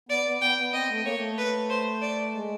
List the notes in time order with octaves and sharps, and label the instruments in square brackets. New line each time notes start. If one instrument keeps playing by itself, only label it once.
[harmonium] B3 [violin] D5
[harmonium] B3
[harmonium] B3 [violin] G5
[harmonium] B3
[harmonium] C4 [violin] D#5
[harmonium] A3
[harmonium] A#3 [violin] C#5
[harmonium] A3
[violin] B4
C5
D5
[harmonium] G#3